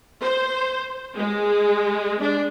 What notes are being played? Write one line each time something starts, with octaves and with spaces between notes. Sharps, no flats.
C5
G#3
D4